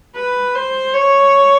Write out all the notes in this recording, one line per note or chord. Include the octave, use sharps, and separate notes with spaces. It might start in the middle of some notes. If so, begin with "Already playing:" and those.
B4
C5
C#5